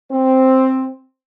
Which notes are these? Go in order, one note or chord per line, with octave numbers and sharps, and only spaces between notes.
C4